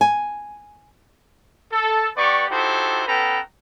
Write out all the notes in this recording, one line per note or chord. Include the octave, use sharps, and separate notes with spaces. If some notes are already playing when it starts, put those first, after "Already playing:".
G#5
A4
B3 G4 B4 D5 C#6
D#4 E4 F#4 G4 A4 C5
B3 C#4 A4 B4 G5 A#5